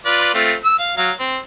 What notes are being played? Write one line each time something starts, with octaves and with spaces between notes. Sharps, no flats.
F4 B4 D5
A3 C4 F4
E6
F5
F#3 F5
C4